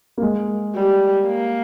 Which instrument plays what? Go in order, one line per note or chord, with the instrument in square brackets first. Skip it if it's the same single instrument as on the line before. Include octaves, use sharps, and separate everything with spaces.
[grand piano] A#3
G#3
[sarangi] G3
A#3